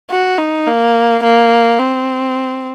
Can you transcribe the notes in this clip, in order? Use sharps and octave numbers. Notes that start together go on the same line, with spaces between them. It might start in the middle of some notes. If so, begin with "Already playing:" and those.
F#4
D#4
A#3
A#3
C4